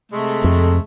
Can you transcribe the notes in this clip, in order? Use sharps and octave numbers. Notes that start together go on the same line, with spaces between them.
C3 G#3 A3
F2